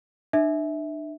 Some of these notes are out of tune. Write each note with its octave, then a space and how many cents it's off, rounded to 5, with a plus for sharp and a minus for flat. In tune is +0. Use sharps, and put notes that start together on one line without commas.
D4 +40 E5 -20